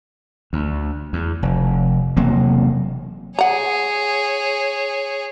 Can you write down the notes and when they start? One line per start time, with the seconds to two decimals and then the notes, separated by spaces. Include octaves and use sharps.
0.53 D2
1.13 E2
1.43 F1
2.17 E1 C3 F#3 A#3
3.39 G#4 C#5 F#5 A#5